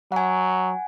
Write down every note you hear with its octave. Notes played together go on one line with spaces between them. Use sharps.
F#3 F#5 G#5